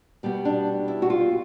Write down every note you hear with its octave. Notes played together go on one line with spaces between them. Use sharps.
B2 G3 B3
D4
E4
F#4
F4